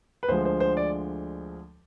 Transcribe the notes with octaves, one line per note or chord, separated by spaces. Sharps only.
B4
D2 D3 F3 G#3 C5
C5
C5
D5